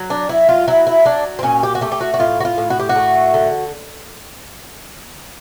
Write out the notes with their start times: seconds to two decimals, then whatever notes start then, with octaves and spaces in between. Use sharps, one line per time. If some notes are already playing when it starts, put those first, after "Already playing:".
Already playing: F#3
0.10 D4
0.29 F#3 E4
0.49 F4
0.68 F#3 E4
0.87 E4
1.05 F#3 D4
1.39 C4
1.43 A#2 C#4
1.63 G4
1.75 F#4
1.81 A3 G4
1.92 G4
2.01 F#4
2.14 F#4
2.19 A2 F4
2.40 F#4
2.45 F4
2.58 A2
2.70 F#4
2.80 G4
2.89 F#4
2.96 A3
3.34 D3